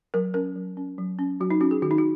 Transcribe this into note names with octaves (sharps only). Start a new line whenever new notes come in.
F#3 A#4
C#4 A#4
F#3
C#4
F#3
C#4
F#3 F#4
D#4
C#4 F#4
G#4
D#3 F#4
D#4
F#4